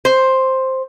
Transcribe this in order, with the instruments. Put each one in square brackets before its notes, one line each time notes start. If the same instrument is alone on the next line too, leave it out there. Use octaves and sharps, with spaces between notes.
[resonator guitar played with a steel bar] C5